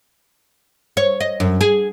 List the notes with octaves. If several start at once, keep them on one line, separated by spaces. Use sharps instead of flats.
C#5
D#5
F#2
G#4